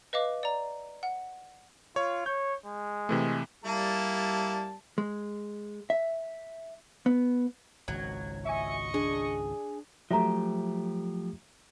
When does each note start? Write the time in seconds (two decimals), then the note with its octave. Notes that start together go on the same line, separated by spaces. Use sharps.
0.13 B4 D#5 F5 D6
0.43 D5 A#5
1.03 F#5
1.96 F4 C#5
2.26 C#5 G6
2.66 G#3
3.09 C3 E3 A3
3.64 G3 A#3 E4 A5
4.98 G#3
5.90 E5
7.06 B3
7.88 G#1 C#2 F#3 G#6
8.45 D#5 E5 G#5 C#6
8.94 D4 G#4
10.11 F3 F#3 A3 G4 E5 A#5